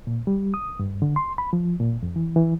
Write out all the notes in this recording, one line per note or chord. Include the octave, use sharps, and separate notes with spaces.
A#2
G3
D#6
G2
D3
C6
B5
F3
A#2
F2
E3
E3